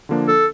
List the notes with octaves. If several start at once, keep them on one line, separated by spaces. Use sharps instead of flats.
D3 F3 A#3 D4
A4